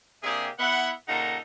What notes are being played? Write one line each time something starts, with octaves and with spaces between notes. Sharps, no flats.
C3 A#3 D4 G4 G#4
B3 E4 E5 F#5
A#2 C#3 D#4 A4 F#5 A#5